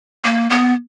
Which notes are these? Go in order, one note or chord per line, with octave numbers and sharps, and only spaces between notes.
A#3
B3